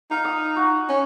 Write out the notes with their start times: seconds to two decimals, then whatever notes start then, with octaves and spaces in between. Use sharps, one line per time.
0.11 D#4 F5
0.25 D#6
0.56 F#4
0.89 C#4